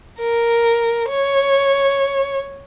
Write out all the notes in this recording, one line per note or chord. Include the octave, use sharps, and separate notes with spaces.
A#4
C#5